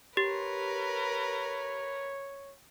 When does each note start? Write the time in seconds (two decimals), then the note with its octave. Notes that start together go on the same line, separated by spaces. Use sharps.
0.17 G4 A#4 B4 C#5